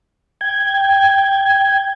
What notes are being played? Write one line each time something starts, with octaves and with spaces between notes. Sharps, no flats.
G5 G#6